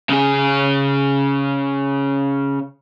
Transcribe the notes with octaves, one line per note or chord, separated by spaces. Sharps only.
C#3 G#4